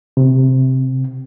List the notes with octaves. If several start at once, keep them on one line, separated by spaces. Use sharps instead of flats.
C3